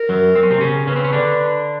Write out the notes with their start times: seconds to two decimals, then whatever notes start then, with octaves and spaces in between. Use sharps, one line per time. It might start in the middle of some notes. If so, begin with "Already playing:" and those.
Already playing: A#4
0.09 F#2 F#3
0.35 C4
0.43 C#4
0.50 C3 C4
0.61 C#3 C#4
0.87 C#3 C#4 B4
0.96 C4
1.04 C#4
1.13 D3 D4